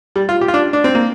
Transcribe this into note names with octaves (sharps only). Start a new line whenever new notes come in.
G3
F4
G4
F4
D4
D4
C4
A#3